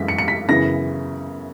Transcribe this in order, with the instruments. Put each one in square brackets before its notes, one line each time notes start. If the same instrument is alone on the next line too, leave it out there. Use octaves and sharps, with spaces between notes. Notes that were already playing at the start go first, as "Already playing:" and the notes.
Already playing: [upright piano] F#2 E3 G#3 B6
C#7
C#7
B6
F#2 C#3 E3 B3 E4 A#6